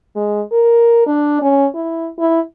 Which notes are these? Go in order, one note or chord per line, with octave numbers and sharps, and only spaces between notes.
G#3
A#4
D4
C#4
E4
E4